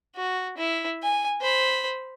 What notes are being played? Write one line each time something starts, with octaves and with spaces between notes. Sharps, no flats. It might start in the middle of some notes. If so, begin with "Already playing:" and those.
F#4
E4
G#5
C5 B5